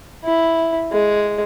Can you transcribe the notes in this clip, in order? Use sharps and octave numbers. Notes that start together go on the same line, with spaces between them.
E4
G#3